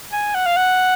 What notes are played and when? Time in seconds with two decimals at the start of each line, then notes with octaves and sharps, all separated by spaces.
0.13 G#5
0.35 F#5
0.46 F5
0.57 F#5